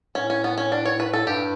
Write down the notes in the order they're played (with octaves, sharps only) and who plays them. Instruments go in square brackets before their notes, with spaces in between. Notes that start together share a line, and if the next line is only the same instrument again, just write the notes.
[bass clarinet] A2 [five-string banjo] C#4
[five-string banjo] C#4
B3
C#4
D4
C#5
B4
A4
[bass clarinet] G2 [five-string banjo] G4